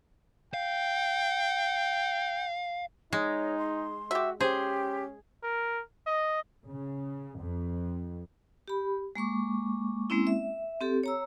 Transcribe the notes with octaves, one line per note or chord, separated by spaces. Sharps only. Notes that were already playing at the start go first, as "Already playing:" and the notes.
F5 G5
G#3 D#4 C#5
C6
F#4 G4 E5
C#4 G4 G#4 C5
A#4
D#5
C#3
F2
G4 B5
G#3 A#3 C#6 D6
G#3 A#3 C4 C#4 E4
E5
C4 G4 A4
C#5 A#5 E6